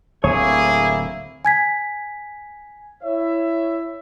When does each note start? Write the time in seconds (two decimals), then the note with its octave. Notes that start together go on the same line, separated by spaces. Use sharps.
0.24 D1 D2 A2 A#3 C4 E4 G#4 C#5
1.45 G#5 G#6 B6
3.03 E4 C#5 E5